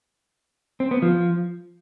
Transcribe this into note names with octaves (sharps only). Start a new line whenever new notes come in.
C4
B3
F3